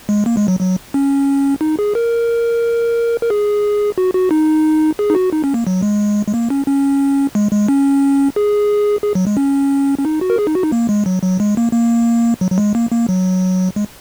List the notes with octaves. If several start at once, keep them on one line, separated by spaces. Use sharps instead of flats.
G#3
A#3
G#3
F#3
F#3
C#4
D#4
G#4
A#4
A#4
G#4
F#4
F#4
D#4
G#4
D#4
F#4
D#4
C#4
A#3
F#3
G#3
G#3
A#3
C#4
C#4
G#3
G#3
C#4
G#4
G#4
F#3
G#3
C#4
C#4
D#4
F#4
A#4
G#4
D#4
F#4
D#4
A#3
G#3
F#3
F#3
G#3
A#3
A#3
F#3
F#3
G#3
A#3
A#3
F#3
G#3